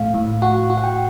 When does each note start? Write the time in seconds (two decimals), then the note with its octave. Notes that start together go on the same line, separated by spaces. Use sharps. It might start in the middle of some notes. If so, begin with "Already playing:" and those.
Already playing: A2 F3 A3 F5
0.14 A2
0.42 F#4 F#5
0.70 F#4
0.77 F#5
0.84 G5